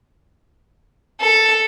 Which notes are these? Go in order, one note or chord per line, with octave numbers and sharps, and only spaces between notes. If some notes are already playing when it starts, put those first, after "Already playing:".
A4